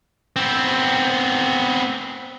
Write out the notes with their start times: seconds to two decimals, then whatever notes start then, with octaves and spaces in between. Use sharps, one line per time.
0.36 B3 C4